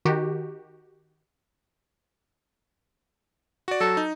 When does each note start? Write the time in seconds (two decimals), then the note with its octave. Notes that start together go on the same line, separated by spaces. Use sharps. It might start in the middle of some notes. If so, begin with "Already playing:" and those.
0.05 D#3 F#4 G4
3.68 F#4 D5
3.80 F#3 F#4 A4
3.97 D#4